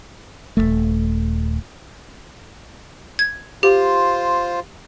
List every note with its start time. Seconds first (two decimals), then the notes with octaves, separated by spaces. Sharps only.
0.57 D#1 G#1 A3
3.19 G#6
3.63 F4 G4 C5